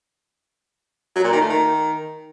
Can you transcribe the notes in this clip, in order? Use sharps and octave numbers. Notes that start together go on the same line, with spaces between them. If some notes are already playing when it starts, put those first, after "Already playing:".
F#3
A#2
D#3
A3
D#3